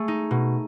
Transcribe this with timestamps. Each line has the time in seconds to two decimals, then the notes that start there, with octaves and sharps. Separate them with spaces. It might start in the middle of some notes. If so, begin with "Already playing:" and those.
Already playing: A3 G#4
0.08 D#4
0.31 B2